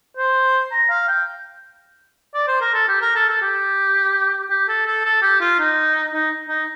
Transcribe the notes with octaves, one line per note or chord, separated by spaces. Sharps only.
C5
A#5
F5
G5
D5
C5
A#4
A4
G4
A#4
A4
A4
G4
G4
A4
A4
A4
G4
F4
D#4
D#4
D#4